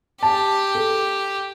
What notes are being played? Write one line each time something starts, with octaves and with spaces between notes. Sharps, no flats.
G4 A5
A4